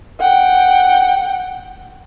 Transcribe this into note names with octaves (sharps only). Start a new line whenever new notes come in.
F#5 G5